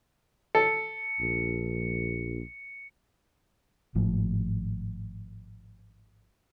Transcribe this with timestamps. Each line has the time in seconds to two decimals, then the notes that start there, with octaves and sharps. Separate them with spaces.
0.55 A4 C#7
1.19 A#1
3.95 G#1 A2 F3